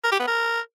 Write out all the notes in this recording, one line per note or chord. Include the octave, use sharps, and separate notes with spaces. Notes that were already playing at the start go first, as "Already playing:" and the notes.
A#4
G4
B3
A#4